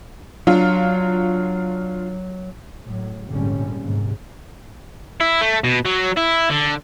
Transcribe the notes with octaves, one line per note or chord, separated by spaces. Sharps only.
F#3 D4 F4
A2 F#3
A#1 F2 G#2 D3 G3 C#4
D#2 G#2 C3
E4
A3
B2
F#3
E4
D3